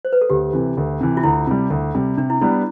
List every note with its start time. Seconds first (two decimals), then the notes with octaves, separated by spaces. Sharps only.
0.05 C5
0.13 B4
0.21 A4
0.30 D2 G4
0.53 C3 E3
0.78 D2
1.00 C3 E3
1.17 F4
1.24 D2 E4
1.47 C3 G3
1.70 D2
1.95 C3 G3
2.17 C3 D4
2.30 E4
2.41 G3 B3 D4 E4